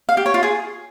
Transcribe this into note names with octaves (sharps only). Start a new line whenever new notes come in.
F5
G4
C#5
F4
G#4